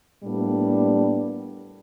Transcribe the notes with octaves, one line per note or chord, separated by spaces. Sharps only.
A2 G3 A#3 B3 D4